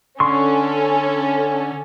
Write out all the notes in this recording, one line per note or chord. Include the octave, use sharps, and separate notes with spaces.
D3 C#4 A4 C6 C#6